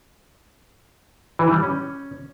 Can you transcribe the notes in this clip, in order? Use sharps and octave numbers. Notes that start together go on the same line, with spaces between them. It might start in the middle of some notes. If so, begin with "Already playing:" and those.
E3
G3
C#4